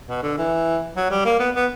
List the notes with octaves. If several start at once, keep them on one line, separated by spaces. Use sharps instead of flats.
B2
D3
E3
F#3
G3
A#3
B3
B3